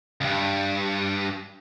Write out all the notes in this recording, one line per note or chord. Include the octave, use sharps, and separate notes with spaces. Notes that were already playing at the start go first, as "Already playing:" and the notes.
C#2 G2